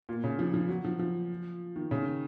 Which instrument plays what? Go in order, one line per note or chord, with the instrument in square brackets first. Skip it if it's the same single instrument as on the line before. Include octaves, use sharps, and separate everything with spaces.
[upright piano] A#2
C#3
F3
F3
F#3
F3
F3
D#3
C#3
D#3